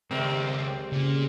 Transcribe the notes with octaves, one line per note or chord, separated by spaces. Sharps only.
C#2 D#3 G3 G#3 C4 A#4
A#2 C#3